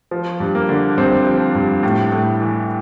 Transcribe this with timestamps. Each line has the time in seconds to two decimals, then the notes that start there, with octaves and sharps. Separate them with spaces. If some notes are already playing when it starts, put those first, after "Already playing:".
0.11 F3
0.40 G2
0.55 A#3
0.69 D3
0.97 G2 C4
1.27 F3
1.55 G2
1.83 A2
2.12 A2
2.41 E3